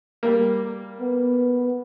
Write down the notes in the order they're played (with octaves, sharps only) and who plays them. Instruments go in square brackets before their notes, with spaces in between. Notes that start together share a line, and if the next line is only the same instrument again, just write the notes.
[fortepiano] G3 A#3
[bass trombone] B3